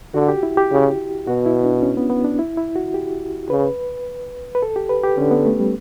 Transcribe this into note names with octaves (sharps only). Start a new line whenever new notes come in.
D3 F#4
G4
E4
G4
C#3
B2 F#4
E4
D4
C#4
B3
B3
D4
E4
E4
F#4
G4
C#3 B4
B4
A4
G4
B4
G4
D3 C#4
B3
A3
G3